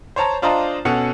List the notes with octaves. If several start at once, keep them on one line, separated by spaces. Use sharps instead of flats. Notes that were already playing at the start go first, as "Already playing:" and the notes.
C5 C#5 A5 A#5
D4 F4 C5 D#5 A5 A#5
B2 C#4 A4 F#5